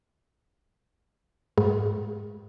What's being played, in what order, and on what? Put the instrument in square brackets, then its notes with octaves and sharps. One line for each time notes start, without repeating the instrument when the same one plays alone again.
[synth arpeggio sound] G#2